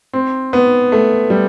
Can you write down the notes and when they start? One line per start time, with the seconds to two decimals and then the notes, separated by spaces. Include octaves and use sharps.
0.13 C4
0.53 B3
0.92 A3
1.30 G3